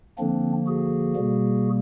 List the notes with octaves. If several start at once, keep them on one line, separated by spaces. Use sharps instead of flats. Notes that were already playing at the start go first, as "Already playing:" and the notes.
D3 F3 A#3 C4 D4
F#4 G#4
B2 G3 A#3